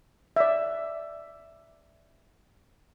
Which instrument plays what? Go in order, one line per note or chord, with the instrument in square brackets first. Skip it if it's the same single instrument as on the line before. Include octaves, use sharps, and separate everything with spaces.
[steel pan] D5 E5